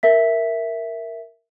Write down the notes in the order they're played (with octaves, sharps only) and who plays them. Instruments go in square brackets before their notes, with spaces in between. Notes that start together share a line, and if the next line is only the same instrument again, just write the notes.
[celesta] A#4 E5 B6